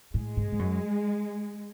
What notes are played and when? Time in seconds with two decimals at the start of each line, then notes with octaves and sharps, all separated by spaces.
0.14 A2 G#3
0.37 G#2
0.52 G#2
0.59 F#2